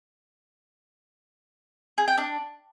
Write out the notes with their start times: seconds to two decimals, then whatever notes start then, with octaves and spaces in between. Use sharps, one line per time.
1.98 G#4
2.08 G5
2.18 D4